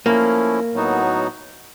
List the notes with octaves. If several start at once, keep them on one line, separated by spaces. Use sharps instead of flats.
F3 A3 A#3 C#4 E4
A2 F#3 B3 D#4 F#4